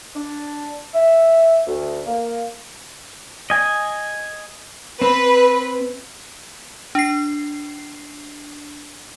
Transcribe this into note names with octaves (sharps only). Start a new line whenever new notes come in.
D4
E5
D2
A#3
D#5 G#5
C4 B4
D4 C7